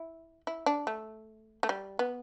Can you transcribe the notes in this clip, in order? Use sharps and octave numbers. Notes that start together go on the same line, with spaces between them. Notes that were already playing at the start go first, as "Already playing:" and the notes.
Already playing: E4
E4
D4
A3
A3
G3
B3